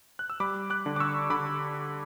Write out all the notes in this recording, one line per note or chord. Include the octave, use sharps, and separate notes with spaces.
F#6
E6
G3 B5 D6
D6 F#6
D3
D6
C#6 E6
D3 B5 D6